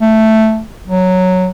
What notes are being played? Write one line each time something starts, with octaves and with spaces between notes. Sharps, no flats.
A3
F#3